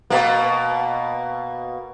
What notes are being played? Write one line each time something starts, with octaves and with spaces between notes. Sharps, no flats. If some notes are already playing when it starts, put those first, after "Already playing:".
B2 A#3